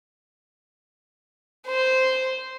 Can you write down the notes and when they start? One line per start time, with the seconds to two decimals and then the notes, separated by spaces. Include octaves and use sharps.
1.66 C5